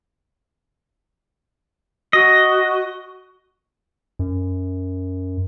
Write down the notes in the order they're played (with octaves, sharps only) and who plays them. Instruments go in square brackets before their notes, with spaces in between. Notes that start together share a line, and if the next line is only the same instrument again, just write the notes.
[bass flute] F#4 [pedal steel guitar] D#5
[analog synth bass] F#2